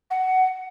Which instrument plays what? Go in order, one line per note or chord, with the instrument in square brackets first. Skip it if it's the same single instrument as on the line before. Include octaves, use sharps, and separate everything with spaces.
[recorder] F#5